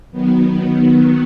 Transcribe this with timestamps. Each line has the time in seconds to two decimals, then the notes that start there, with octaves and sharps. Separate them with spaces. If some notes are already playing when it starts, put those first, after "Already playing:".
0.11 D#3 F#3 B3